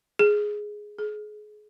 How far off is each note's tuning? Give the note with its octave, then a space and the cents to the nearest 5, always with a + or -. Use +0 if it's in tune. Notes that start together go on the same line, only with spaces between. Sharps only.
G#4 +5
G#4 +30